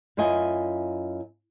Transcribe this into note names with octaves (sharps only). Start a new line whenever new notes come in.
F#2 E4 F4 D#5 G#5